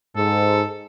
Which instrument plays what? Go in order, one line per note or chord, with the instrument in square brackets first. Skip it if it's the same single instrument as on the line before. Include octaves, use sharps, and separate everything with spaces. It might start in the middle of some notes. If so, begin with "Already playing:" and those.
[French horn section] G#2 [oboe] A4